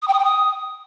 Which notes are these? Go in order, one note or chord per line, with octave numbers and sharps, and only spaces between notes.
D#6
G5
D#6
G5
D#6